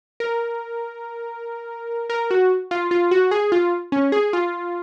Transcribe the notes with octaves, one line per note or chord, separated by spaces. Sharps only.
A#4
A#4
F#4
F4
F4
F#4
G#4
F4
C#4
G#4
F4